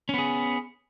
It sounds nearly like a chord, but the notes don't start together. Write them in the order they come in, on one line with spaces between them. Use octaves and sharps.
C#4 B3 G#4